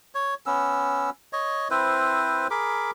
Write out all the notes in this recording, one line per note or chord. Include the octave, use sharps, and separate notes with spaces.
C#5
B3 C#4 E6
C#5 D#5
C4 E4 B4 C5
G#4 A#4 B5 D6